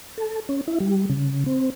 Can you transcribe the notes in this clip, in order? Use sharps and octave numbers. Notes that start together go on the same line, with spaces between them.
A4
C#4
E4
G3
C#3
C4